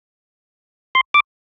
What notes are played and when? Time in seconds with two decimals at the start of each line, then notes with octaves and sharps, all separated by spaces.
0.95 C6
1.14 D6